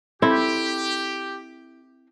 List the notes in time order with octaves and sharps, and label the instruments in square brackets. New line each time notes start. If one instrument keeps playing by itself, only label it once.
[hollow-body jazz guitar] C4 A4 C6 [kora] E4 [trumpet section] G4